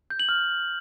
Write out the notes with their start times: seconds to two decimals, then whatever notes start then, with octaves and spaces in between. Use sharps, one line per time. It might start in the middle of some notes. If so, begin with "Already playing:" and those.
0.10 G6
0.20 F#7
0.29 F6